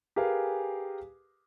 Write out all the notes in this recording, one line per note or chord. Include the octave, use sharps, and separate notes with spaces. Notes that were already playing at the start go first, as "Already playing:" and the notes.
G4 G#4 A#4 B4 F5 G#5